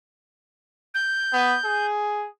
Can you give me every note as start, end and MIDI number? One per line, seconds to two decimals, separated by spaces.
0.94 1.86 91
1.33 1.56 59
1.64 2.27 68